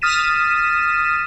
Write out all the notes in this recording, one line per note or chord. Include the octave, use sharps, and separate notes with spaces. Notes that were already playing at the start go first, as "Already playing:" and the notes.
D#6 F6 A6 B6 D#7 E7